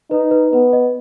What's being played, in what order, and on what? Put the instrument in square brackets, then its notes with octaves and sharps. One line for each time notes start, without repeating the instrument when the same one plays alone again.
[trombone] D#4 [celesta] B4
[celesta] B4
[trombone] B3 [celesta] B4
[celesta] D#5